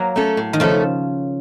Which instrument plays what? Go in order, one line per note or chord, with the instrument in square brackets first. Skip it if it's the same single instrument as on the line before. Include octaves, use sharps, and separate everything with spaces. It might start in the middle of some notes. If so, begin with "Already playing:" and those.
Already playing: [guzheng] F#3 A#3
[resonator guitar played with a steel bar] A3 C#4 A4
A2
[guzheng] D#3
[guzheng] C#3 F3 [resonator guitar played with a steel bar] A3 C#4 A4